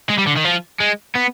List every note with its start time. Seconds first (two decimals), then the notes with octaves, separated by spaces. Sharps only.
0.10 G#3
0.19 G3
0.27 D3
0.37 D#3
0.45 F3
0.80 G#3
1.15 B3